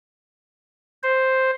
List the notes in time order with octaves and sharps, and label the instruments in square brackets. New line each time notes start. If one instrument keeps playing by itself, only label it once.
[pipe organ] C5